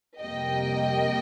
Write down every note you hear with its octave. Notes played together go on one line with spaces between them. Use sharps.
F2 C3 G3 A#3 D#5 G5